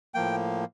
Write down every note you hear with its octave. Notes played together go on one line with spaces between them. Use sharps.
A2 F3 A#3 G5